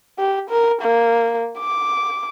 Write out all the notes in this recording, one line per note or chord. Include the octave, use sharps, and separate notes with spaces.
G4
A#4
A#3
D6